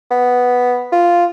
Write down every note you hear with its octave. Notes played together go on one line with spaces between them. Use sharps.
B3
F4